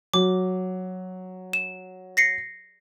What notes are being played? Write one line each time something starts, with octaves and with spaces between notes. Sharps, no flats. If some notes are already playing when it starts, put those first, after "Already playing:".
F#3 D6
E7
A#6 C7 C#7